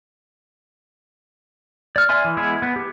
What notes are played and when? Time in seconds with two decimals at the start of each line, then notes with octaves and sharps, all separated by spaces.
1.96 D5 F6
2.09 D5 E5 G#5 C6
2.24 E3
2.37 G#3 B3 E4 G#4
2.62 B3
2.76 G4